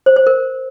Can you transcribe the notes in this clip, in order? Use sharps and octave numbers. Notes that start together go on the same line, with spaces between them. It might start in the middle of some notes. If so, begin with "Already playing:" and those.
C5
C5
A#4